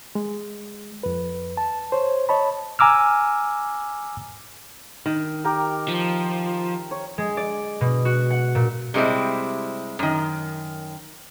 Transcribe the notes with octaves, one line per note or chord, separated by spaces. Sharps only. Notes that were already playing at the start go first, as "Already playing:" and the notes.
G#3
F2 B4
A5
C5 C#5
C#5 D#5 A5 B5
G#5 A#5 D6 E6 F6
D#3
G4 A#4
F3
C#5
G#3
D5
B2
F#4
F#5
A#2
C3 G3 G#3 C4 E4
F#2 D#3